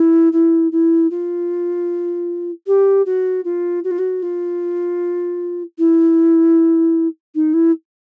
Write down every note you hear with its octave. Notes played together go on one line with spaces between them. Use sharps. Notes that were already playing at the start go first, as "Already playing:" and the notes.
Already playing: E4
E4
E4
F4
G4
F#4
F4
F#4
F4
F#4
F4
E4
D#4
E4